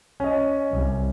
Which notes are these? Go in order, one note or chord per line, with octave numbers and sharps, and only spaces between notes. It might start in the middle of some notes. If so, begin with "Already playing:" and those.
C#4 D#5
C2